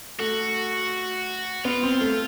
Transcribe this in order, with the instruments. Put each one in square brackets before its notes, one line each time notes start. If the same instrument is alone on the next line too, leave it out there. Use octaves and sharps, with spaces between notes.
[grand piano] A3 [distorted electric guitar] F#4
[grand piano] B3 [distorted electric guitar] F4
[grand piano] C4
A3